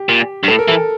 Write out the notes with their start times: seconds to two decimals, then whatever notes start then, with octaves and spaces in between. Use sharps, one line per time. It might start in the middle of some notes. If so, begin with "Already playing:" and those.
Already playing: G4
0.09 A#2
0.43 G2
0.48 A2 A4
0.59 A#4
0.68 E3 A4